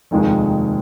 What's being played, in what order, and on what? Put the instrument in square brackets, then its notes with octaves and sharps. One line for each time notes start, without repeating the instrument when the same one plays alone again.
[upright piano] F1 D#2 D#3 G#3